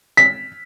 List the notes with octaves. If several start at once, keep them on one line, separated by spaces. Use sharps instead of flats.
B6